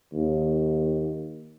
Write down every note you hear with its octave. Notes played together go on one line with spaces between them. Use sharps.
D#2